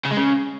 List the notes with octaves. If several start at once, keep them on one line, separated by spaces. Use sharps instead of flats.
C#3
G#3
C#3